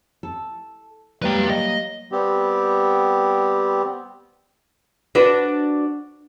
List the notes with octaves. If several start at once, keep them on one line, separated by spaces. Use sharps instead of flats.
A4
F#3 G3 A#3 B4 G5
D#5
G3 B3 C4 G4
D4 F#4 B4